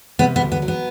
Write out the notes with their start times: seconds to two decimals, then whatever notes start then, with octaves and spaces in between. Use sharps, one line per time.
0.19 C3 B3
0.36 B3
0.42 D2
0.52 B3
0.62 F#3
0.68 B3